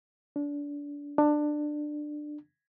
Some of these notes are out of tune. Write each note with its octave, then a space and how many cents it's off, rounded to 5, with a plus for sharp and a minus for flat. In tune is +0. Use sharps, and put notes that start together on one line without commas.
D4 -25
D4 +20